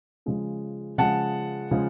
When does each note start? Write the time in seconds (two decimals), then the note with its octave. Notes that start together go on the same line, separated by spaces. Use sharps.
0.26 C#3 F3 G#3
0.98 C#3 F3 G#3 F#5 A5
1.71 C#3 F3 G#3